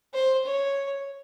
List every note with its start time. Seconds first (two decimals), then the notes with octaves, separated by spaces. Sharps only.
0.14 C5
0.45 C#5